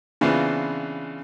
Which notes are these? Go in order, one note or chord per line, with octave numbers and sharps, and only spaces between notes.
C#3 E3 B3 C4 D4 F4